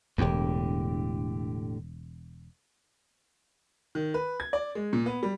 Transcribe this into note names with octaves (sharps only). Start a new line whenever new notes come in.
E1 E2 A2 D3 G4
D#3
B4
G#6
D5
G#3
A#2
B3
G3